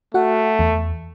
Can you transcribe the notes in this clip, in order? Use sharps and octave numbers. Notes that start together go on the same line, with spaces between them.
A3 F#4 F#5
E2